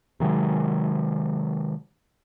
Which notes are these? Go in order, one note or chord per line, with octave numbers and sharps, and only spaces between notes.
C3 D#3 F#3 G#3